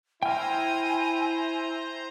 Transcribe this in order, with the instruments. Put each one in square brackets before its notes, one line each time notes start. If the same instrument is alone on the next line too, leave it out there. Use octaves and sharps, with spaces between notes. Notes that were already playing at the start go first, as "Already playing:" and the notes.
[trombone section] E4 [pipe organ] C5 A#5 [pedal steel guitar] G5 F6 [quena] G#5